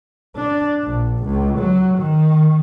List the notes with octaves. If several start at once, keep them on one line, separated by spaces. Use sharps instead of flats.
D4
A#1
C#2
F#3
D#3